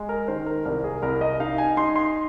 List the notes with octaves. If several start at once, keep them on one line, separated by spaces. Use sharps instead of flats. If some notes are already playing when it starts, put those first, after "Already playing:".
Already playing: G#3
A#4
D#3 C5
A#4
C2 A#4
G#4
C2 A#4
D#5
D#4 F5
G#5
D#4 C6
C6